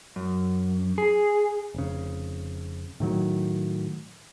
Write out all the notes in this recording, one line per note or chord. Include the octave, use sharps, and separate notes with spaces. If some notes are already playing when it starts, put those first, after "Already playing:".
F#2
G#4
F1 C#3
A2 D#3 F#3